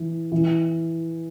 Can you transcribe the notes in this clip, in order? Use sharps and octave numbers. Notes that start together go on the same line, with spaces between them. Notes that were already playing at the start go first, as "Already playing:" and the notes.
Already playing: E3
E3